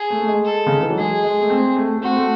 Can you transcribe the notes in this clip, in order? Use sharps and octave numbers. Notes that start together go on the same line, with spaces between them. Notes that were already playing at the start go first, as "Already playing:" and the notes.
Already playing: G#4
A3
A3
G#3
A4
C#3
D#3
E3
F#3
G#3 G#4
G#3
A3
C4
A3
A3
C4 F#4
A3